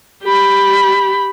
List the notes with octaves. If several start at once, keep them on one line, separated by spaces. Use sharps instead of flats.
G4 B5